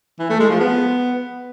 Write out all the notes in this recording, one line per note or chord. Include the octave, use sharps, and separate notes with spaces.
E3
A3
G#3
F3
B3